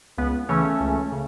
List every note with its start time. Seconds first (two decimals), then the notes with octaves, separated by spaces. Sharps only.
0.18 C#2 B3
0.49 C#3 E3 A3 C#4
0.80 C#2
1.12 C#3